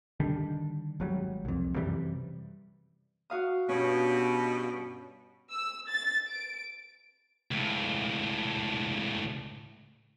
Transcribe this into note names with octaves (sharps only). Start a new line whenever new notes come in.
D3 D#3 G3 D4
G#1 F#3 G3
C2 F2
F#2 C3 E3 G3
F#4 F5 D#6
G2 B2 C#4
E6
A6
D7
C#2 A2